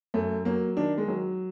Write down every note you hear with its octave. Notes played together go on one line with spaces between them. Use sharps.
F#2 A3
F#3 A#3
D#3 D4
G#3
F#3